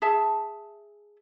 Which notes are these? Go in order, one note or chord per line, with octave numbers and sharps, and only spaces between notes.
G#4 E5 A5